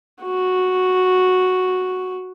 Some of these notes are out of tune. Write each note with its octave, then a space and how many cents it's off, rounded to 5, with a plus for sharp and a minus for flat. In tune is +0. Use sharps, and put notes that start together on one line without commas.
F#4 -5